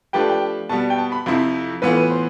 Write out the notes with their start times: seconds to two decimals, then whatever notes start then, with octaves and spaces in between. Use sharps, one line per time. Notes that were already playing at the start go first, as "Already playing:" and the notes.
0.13 F3 A3 D4 G4 B4 G5
0.20 A5
0.29 G5
0.69 B2 G3 B3 A5
0.90 G5
0.98 A5
1.12 B5
1.26 F2 C3 F3 C4 E4
1.82 A2 E3 B3 F4 B4
1.97 B4
2.11 C5